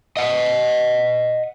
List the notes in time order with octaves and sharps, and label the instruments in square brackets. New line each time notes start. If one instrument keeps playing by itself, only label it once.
[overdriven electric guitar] D#5 F#5